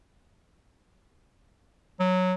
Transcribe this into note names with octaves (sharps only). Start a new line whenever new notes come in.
F#3